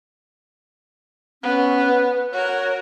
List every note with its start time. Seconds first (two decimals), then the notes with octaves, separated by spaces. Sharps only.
1.43 B3 C#4
1.86 B4
2.33 F#4 A#4 C#5